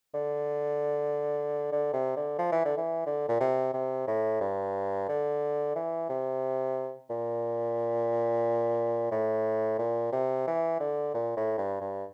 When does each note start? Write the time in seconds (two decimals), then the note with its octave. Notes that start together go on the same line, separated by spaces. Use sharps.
0.14 D3
1.72 D3
1.93 C3
2.16 D3
2.38 F3
2.52 E3
2.65 D3
2.77 E3
3.06 D3
3.28 A#2
3.40 C3
3.73 C3
4.07 A2
4.41 G2
5.08 D3
5.75 E3
6.09 C3
7.10 A#2
9.11 A2
9.78 A#2
10.12 C3
10.47 E3
10.80 D3
11.14 A#2
11.37 A2
11.58 G2
11.81 G2